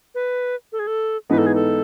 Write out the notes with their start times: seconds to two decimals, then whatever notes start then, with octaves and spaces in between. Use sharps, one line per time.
0.15 B4
0.72 A4
0.79 G#4
0.87 A4
1.29 G#2 E3 B3 D#4 B4
1.38 A4
1.46 G#4
1.55 A4